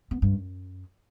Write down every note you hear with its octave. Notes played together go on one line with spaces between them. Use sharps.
B3
G2
F#2